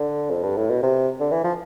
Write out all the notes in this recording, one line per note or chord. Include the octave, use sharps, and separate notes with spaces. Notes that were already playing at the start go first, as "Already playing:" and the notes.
Already playing: D3
F2
G2
A2
B2
C3
D3
E3
F3